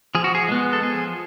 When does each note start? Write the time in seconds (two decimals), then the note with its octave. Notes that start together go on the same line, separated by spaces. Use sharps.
0.15 F3 G#4
0.24 F#4
0.35 G#4
0.48 G#3 B3
0.73 A4
0.82 F3 G#4